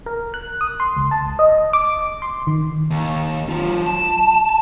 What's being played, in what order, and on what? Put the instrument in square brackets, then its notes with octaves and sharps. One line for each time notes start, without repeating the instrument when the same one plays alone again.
[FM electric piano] A#4
F#6
D#6
C6
C#2
A5
D#5
D6
C6
D#3
[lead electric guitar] D#2
F#3 F4
A5